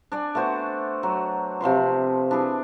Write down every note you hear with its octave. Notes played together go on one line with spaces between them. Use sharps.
D4 D5 G#5
A3 B3 F#4 C5
F#3
C3 F3 B4 C6
D4 E4 G#4 B4